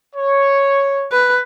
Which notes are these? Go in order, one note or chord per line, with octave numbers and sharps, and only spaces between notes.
C#5
B4